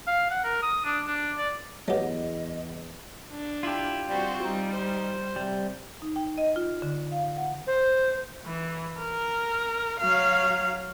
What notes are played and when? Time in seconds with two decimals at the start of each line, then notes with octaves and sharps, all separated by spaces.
0.07 F5
0.31 F#5
0.44 A#4
0.63 D#6
0.85 D4
1.07 D4
1.38 D5
1.88 E2 F#3 A3 B3 G4 D#5
3.31 D4
3.63 E4 F4 G4
4.10 G3 C4 F#4 C5
4.44 G3 D#4
4.73 C5
5.36 C3 G3
6.02 D#4
6.16 G5
6.38 D#5
6.56 F4
6.82 D3
7.12 F5
7.37 F#5
7.67 C5
8.45 E3
8.99 A#4
9.99 F#3 F5